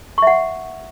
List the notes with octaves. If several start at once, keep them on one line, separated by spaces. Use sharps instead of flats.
E5 F#5 C#6